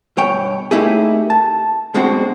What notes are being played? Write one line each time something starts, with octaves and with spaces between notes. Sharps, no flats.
G2 B2 C#5 G5
A3 A#3 D#4 E4 G4 G#4
A5
B1 B2 G#3 C4 D4 F#4